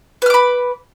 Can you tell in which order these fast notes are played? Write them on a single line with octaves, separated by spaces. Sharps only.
B4 F6 D6 B5